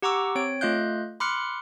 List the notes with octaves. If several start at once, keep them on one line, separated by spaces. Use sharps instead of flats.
G4 F#5 A#5 C#6 D6 E6
C4 C#5 D7
A3 F4 D#5 F5 F#6 G6
B5 C6 D6 F6 F#6 C#7